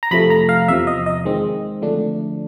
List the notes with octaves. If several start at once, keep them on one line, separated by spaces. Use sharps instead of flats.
A#5
F2 C3 F3 A3 B5
A#5
F5
E2 C3 F3 E5
D#5
D#5
D#3 G#3 C4
D3 F3 A3 D4